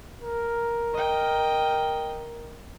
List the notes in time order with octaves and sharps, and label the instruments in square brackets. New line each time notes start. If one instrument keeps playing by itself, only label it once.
[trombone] A#4
[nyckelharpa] D#5 G5